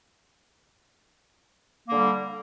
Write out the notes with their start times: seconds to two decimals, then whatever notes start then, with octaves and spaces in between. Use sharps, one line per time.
1.88 A#3
1.92 D3
1.97 G3